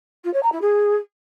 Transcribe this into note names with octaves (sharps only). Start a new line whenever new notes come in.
F4
C#5
A#5
E4
G#4